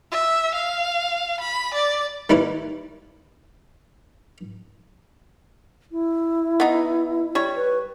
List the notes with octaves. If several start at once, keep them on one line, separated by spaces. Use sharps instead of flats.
E5
F5
B5
D5
D#3 G3 A#3 E4 B4 C#5
E4
B3 D#4
G3 C#5
B4